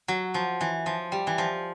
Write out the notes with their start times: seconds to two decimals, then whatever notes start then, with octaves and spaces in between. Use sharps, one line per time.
0.08 F#3
0.34 F3
0.61 E3
0.86 F3
1.12 G3
1.27 E3
1.38 F3